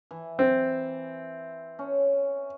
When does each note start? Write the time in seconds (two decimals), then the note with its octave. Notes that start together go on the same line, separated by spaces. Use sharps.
0.11 E3
0.39 C4
1.79 C#4